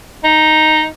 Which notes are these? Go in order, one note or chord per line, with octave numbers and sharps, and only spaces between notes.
D#4